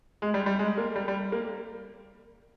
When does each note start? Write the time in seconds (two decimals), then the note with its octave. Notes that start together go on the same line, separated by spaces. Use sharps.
0.22 G#3
0.34 G3
0.46 G3
0.59 G#3
0.78 A#3
0.96 G3
1.08 G3
1.32 A#3